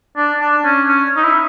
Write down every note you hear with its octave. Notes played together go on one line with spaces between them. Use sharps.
D4
D4
C#4
C#4
D#4
E4